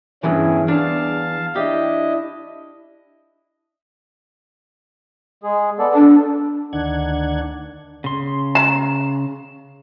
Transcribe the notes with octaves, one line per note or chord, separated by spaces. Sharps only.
E2 G2 E3 C#4 E4 G#4
E2 D4 F5 A5
D4 E4 G4 D#5
G#3 G#4
B3 A4 D5
D4 A4
D2 D#3 D4 F#5 G#6
C#3 C6
A#5